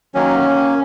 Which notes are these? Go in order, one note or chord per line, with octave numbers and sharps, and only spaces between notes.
D#3 F#3 A#3 C#4